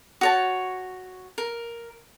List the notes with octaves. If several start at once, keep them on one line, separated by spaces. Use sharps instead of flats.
F#4 C#5 A5
A#4